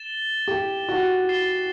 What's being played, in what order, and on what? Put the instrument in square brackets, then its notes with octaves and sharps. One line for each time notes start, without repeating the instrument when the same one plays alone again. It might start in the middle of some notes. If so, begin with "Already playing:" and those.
Already playing: [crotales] A6 E7 G7
[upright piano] G4
F#4
[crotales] A6 C7 E7 G7